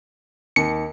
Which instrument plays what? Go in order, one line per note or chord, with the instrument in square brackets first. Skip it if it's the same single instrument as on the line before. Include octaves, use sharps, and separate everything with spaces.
[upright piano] D#2 [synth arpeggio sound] C#7